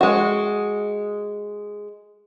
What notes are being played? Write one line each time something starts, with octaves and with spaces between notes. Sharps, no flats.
G#3 F#4